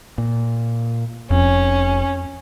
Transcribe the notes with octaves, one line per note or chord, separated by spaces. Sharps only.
A#2
F1 F2 C#4